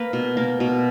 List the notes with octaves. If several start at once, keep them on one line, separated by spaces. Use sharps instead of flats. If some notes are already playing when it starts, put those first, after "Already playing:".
Already playing: A#3 B4
B2
A#3
B2